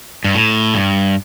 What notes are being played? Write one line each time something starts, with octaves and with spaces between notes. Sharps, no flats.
G2
A2
G2